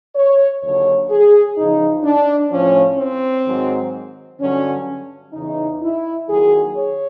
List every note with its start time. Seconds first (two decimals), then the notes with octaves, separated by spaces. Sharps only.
0.15 C#5
0.62 D#2 D3 F#3 C#5
1.09 G#4
1.56 E2 C#3 F3 D#4
2.03 D4
2.50 A2 F3 C#4
2.98 C4
3.45 G#2 D#3 F#3
4.40 G2 D3 F#3 C#4
5.33 E2 C#3 E3 D#4
5.81 E4
6.28 D#2 D#3 F#3 G#4
6.75 C#5